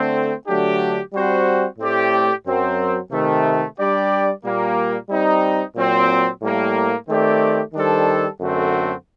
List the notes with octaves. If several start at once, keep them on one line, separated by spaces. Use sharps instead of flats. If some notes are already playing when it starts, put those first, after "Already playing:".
Already playing: D3 A3 C4
D3 F#3 A3 D4 G4
G3 C4 F#4 C5
A2 A3 C4 G4 D5
F#2 F#3 C4 F#4 A#4
C3 D#3 A3
G3 D4 G4 D5
A#2 G3 A#3
G3 C4 D#4
A#2 F#3 C4
A2 G3 A#3
D#3 A3 C4 G4 D5
D#3 G3 D4 A4 C5
F#2 D3 A3 C4 F#4